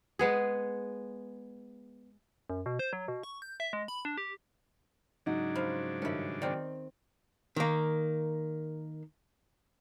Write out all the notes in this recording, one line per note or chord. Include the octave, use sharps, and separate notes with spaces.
G#3 B3 G#4
F#2
B2
C5
F#3
B2
C#6
G6
E5
G#3
B5
D4
G4
G#2 C#3 F#3 D4 D#4
F3 B5
G2 D#3 C#4 E4
D#3 C4 D5 G5
D#3 A#3